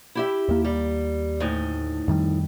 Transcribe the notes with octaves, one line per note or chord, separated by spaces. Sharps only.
E4 G4 E5
D#2 A#3
G3
D2 A2 D#4
F2 D#3 G3